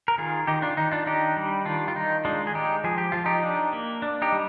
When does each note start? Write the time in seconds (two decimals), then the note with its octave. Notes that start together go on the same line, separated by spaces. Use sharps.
0.08 A#4
0.18 D#3 F4 G#4
0.47 D#3 D#4 G4
0.62 D4 F4
0.77 D#3 D#4
0.91 D4 F4
1.06 D4 D#4 G4
1.36 G3
1.65 D#3 D4 F4
1.88 F4
1.95 D#3 D#4
2.25 G#3 D4 F4
2.47 G#4
2.54 G#3 D#4 G4
2.84 F3 G#4
2.98 G4
3.12 F3 F4
3.26 D#4 G4
3.43 D4
3.73 A#3
4.02 D4
4.22 D#4 G4
4.32 G3